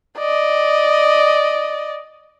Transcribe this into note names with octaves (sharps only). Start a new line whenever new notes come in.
D5 D#5